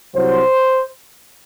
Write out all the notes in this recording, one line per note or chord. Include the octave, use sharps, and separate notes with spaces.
C2 C3 F#3 C5